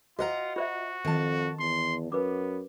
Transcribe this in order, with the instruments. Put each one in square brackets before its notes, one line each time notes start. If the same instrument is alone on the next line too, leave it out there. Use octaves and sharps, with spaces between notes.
[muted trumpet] F4 [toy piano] F#4 C5 [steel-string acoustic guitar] D#5 F#5 A#5
[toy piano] F4 C5 E5 [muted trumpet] F#4
[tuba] F2 [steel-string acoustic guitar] D#3 A5
[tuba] E2 [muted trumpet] C6
[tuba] F#2 [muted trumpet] B3 [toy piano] B4 D6